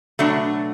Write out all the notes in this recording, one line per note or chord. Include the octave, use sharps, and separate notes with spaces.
B2 F#3 A3 D4